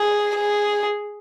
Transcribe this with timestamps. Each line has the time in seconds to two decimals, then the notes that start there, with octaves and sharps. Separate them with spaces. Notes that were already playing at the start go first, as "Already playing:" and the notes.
Already playing: G#4
0.35 G#4